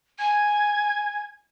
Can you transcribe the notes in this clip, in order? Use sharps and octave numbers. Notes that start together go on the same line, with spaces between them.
G#5 G#6